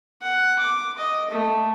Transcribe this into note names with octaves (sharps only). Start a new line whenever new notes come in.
F#5
D6
D#5
A3